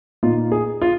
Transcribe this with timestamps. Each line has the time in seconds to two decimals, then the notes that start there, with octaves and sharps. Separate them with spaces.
0.23 A#2 A#3 D#4 F4
0.52 G#4
0.82 F4